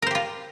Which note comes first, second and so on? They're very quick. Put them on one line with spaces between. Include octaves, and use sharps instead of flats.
A#4 C5 G4 F4